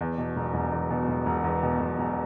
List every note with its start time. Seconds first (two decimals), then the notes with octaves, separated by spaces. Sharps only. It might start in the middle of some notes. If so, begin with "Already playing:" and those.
0.01 E2
0.18 B2
0.36 E1
0.54 E1
0.72 E2
0.90 B2
1.09 E1
1.26 E1
1.44 E2
1.63 B2
1.80 E1
1.99 E1